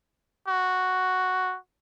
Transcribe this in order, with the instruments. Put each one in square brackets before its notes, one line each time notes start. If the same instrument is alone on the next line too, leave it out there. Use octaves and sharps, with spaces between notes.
[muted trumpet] F#4